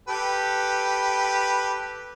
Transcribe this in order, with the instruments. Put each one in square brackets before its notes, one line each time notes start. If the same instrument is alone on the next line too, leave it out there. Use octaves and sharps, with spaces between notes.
[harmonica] G4 A4 B4